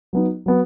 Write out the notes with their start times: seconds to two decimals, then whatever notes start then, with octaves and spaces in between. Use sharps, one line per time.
0.13 F#3 B3 D#4
0.46 F#3 B3